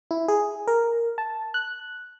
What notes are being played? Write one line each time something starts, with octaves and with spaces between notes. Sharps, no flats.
E4
G#4
A#4
A5
F#6